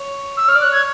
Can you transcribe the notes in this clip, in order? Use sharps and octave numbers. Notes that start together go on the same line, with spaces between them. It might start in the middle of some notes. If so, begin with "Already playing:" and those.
Already playing: C#5
E6
C#5 F6
D5
F#6
C#5
G#6